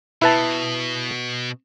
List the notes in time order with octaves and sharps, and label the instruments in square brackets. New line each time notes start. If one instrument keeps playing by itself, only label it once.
[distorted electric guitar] B2 [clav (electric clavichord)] E4 B4 A5